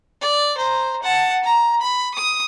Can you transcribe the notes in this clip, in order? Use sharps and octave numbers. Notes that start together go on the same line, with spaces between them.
D5
C5 A#5
F#5 A5
A#5
B5
D#6